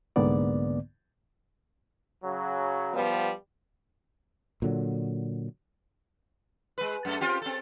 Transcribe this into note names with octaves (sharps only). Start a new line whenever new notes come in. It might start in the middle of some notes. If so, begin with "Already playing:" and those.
C2 G#2 D3 A#3 B3 D5
C#3 F#3
F3 G3 B3
A#2 D3 F#3
G#3 B4
F#2 A3 A4
C4 F4 G4
C4 A4